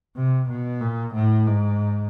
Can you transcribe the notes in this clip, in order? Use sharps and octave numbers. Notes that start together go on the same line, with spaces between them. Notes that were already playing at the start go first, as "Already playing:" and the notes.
C3
B2
A#2
A2
G#2